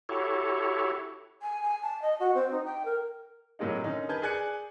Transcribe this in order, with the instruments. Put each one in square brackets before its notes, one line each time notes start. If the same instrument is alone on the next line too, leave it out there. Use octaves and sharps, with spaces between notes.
[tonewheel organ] E4 F#4 G4 A4 C#5
[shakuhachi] G#5
G#5
A5
D#5
F#4
C4
D#4
G5
A#4
[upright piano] A2 C3 F#3 G#3 A#3 D#4
D3 D#3 C#4 D#4
A#4 B4 G#5 A5 G6 G#6
G#4 D5 G#5 F#6 G#6 C#7